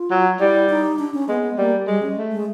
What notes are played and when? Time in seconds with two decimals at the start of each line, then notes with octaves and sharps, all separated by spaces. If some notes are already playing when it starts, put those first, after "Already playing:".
Already playing: F4
0.11 F#3
0.40 G3 E4
0.69 D#4
0.99 D4
1.14 C#4
1.29 G#3 B3
1.43 B3
1.58 G3 A#3
1.87 G3 G#3
2.03 C#4
2.17 A3
2.32 G#3